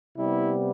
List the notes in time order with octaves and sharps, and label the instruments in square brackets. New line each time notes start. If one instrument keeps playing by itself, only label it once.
[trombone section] C3 G3 B3 E4